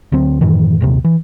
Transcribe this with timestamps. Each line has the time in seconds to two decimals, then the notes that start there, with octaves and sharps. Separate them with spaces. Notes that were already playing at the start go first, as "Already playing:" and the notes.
0.12 D2 F#3 C4
0.41 F#2 A2 D#3 E3
0.81 A#1 D#2 C3
1.05 E3